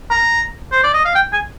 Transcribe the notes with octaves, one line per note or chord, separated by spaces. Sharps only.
A#5
C5
D5
D#5
F5
G5
G#5